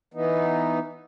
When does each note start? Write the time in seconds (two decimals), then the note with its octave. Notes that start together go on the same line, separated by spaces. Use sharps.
0.14 E3 B3 D#4